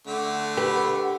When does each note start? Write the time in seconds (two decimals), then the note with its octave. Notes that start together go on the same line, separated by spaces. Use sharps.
0.07 D3 A3 F#5
0.57 G4 B4